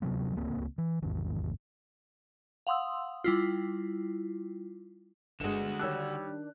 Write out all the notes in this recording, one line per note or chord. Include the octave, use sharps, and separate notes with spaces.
D1 C3 F#3 B3
D1 C#2 A#3 C4
E3
A1 E2 G#2 D#3
F5 F#5 C6 D#6 E6
G3 E4 F4
G1 G2 D3 G#3 F#4 E7
D#3 G3 D4 C#5 E6 F#6